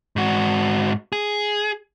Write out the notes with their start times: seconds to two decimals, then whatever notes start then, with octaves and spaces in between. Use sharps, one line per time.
0.16 G#2 F#4
1.12 G#4